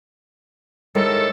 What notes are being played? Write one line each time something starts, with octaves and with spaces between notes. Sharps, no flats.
A2 D#3 G#3 A4